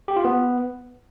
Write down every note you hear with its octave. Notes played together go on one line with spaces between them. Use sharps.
G4
F4
B3